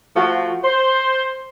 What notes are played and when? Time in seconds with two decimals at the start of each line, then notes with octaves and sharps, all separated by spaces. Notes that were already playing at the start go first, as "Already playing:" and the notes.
0.15 F3 A3 F#4
0.64 C5